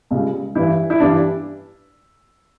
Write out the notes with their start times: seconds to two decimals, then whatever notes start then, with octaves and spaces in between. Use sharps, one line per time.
0.11 C#2 C#3 G3
0.55 G2 E3 G3 E4
0.90 E4
1.00 G2 E3 G3 D4